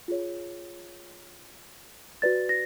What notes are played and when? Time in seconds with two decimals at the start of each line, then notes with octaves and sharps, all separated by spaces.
0.08 F4 G#4 C#5
2.22 F#4 B4 D5 A6
2.49 A#6